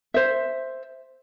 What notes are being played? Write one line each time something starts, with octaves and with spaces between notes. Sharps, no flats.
C5 E5